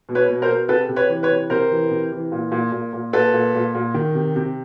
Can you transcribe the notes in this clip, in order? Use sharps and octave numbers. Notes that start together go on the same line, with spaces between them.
B2
B4 C#5
B2
A#4 C5
B2
C3 A4 B4
C3
B4 C#5
E3
B4 C#5
C3
C3 A#4 C5
E3
C3
E3
A#2
A#2
A#2
A#2
A#2 A4 B4
A#2
A#2
A#2
D#3
C3
C3